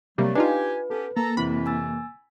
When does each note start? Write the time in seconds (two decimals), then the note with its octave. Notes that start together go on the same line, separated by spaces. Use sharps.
0.18 C3 F#3 G3 A3 A#3
0.35 D4 D#4 F4 G4 B4 G#5
0.90 B3 C#4 G4 A4
1.17 A#3 A4 A#5
1.37 F2 C3 E3 C4 E4 B5 B6
1.66 G#5 E6 A6